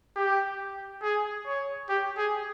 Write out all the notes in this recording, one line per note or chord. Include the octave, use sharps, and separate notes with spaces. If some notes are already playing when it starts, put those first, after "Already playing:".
G4
G#4
C#5
G4
G#4